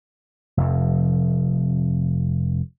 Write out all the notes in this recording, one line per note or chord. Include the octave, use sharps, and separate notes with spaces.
F1 F2